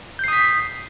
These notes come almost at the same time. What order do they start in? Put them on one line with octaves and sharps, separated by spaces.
G6 C7 D#6 B6